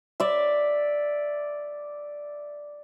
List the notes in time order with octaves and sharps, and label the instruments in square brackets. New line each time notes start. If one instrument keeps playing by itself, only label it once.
[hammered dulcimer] D5 E5